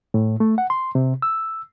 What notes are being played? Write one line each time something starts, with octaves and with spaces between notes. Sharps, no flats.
A2
A3
F#5
C6
C3
E6